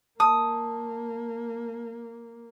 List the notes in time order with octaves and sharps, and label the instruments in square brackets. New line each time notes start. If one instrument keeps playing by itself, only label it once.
[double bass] A#3 [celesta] A5 [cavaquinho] D#6